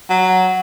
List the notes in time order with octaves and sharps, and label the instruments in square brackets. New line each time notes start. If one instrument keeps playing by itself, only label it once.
[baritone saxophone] F#3